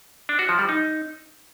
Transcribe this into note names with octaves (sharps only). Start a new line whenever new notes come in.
D4
F#4
F3
G3
D#4